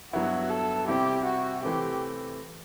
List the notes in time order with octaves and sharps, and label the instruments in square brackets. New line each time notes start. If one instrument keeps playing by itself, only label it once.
[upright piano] G2 F#3 B3 E4 [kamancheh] F#4
[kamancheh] A4
[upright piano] C3 G3 C4 E4 [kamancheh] G4
[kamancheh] F#4
[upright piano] C3 E3 A3 C4 [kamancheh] G4